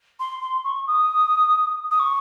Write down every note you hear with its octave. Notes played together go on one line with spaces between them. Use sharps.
C6
C6
C#6
D#6
D#6
C#6